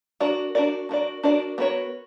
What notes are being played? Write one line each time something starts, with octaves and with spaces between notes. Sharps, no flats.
D4 F#4 A#4 D5
D4 F#4 A#4 D5
D4 F#4 A#4 D5
D4 F#4 A#4 D5
B3 F#4 A#4 C#5